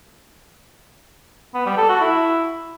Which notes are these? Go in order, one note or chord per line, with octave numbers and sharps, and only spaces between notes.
B3
G3
A4
F#4
E4